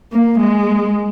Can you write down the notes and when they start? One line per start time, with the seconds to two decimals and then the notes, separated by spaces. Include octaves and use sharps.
0.12 A#3
0.39 G#3